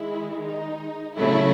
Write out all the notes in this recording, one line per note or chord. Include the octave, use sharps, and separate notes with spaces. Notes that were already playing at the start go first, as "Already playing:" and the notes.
Already playing: D#3 G#3 E4
D#4
C#3 F#3 A3 E4